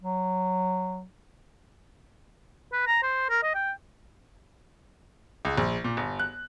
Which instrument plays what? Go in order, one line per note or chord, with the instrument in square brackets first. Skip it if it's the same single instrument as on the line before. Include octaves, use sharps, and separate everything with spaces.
[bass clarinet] F#3
[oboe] B4
A#5
C5
A#4
D#5
G5
[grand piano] C#2
A#1
A#2
G1
F#6